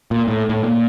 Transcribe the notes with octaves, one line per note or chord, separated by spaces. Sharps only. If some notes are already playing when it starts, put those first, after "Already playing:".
A#2
A2
A2
A#2